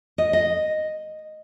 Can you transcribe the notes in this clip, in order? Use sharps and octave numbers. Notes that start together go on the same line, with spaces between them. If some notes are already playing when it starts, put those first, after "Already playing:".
D#5
D#5